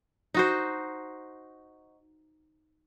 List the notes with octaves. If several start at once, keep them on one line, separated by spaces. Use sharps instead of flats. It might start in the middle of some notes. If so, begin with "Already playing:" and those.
D#4 F#4 C5